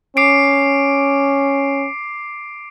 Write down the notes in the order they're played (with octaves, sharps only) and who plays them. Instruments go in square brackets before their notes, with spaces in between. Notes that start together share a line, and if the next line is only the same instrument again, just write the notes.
[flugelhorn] C#4 [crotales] D6 C7 D7